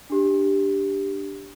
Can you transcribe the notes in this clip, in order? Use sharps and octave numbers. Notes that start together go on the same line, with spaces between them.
D4 G4